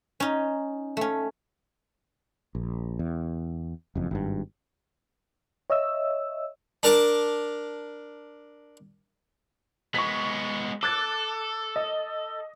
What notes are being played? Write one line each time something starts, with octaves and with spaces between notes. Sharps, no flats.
C#4 D#4
A3 C#4
A#1
E2
F#1 F2
G#1 G2
C#5 D#5 E5 E6
D4 A#4 A5 D6
G#3 B3 C#6 B6
A4 D6 F#6 A6
D#5